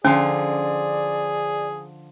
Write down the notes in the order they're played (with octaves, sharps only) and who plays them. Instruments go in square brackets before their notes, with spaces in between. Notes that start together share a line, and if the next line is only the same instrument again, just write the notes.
[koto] D3 F3 [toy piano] C#4 [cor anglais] G#4 [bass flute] D5